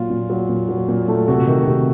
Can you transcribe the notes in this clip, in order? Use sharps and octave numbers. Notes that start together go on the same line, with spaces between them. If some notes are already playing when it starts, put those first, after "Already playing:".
Already playing: A#2 F#3 F4
A#2
F#3
A#2
F#3
A#2
A3
C3 F#4
D#3
C3